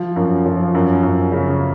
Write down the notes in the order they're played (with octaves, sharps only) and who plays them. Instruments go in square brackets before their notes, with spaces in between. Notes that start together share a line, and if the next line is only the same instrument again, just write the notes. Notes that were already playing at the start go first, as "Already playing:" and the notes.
Already playing: [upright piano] F3
F#2
F3
F#2
F#2
C#3